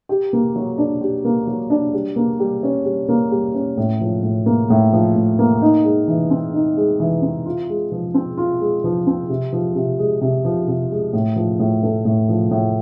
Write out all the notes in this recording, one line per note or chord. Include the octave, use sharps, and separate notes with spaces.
G4
A#3
F#3
D4
G4
A#3
F#3
D4
G3
A#3
G3
C#4
G3
A#3
G3
C#4
A2
F3
A2
A#3
A2
F3
A2
A#3
D#4
G#3
E3
C4
D#4
G#3
E3
C4
F4
G#3
F3
C4
F4
G#3
F3
C4
C3
F3
C3
G#3
C3
F3
C3
G#3
A2
F3
A2
A3
A2
F3
A2